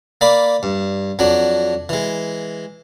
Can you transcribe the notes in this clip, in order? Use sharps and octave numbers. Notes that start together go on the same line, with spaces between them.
A#3 D5 B5
G2
F2 F#3 D4
E3 G#3